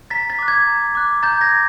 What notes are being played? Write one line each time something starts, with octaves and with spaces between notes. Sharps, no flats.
A#5 A6 B6
A6 B6
D6 F#6
G#6
A#5
D6 F#6
A#5 G6 A6
G#6 A#6
D6